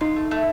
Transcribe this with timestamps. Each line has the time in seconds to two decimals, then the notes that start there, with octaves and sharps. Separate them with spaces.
0.01 D#4 F4
0.16 A3
0.31 A3